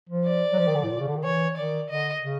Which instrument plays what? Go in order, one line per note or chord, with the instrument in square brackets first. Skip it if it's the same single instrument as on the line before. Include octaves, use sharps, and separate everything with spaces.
[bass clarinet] F3
[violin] D5
[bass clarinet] F#3
F3
D#3
D3
A2
A#2
C#3
D3
D#3
[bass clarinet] E3 [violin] C#5
[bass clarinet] D#3 [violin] D5
[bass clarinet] D3 [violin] D#5
[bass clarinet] C#3